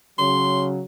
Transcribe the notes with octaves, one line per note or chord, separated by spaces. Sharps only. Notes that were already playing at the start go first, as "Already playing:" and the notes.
C#3 F#3 C6